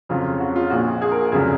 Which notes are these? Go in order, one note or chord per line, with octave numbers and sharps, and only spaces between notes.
F2 C#3 F#3 F4
F#4
F4
A#1 A#2 F3 F#4
G#4
A#4
F1 F2 C#3 F#3 G#4